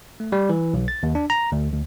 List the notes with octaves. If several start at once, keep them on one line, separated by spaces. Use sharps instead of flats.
A3
G3
E3
B1
A6
D#2
D4
A#5
D2
D2